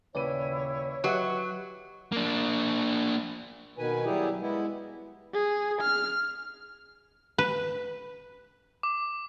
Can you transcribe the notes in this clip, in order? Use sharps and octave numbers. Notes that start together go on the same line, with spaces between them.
D#1 C#3 E4 B4 C#5 D5 D#7
F#3 G4 B4 D#5 E5 F#5
A#3 D4
B2 D#3 B4 G#5
F#3 G3 E4 G4 G#4
G#3 B3 E4
G#4
F6
B4
D6